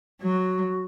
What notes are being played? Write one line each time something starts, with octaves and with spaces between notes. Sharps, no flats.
F#3 F#4